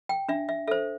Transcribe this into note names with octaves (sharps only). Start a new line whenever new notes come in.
G5
D4 E5
E5
A4 C5 E5